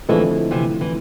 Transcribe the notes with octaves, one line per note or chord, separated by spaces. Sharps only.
D3 E3 F3 G#3 A3 C4 E4
C3 E3
E3